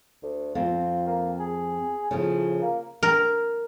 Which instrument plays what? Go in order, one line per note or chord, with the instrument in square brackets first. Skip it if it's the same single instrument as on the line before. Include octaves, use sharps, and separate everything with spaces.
[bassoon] D2
[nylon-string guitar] F2 C4 [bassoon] F4
[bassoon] A#3
G#4
[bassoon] A2 [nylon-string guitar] C#3 F3
[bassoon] A#3
[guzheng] A#4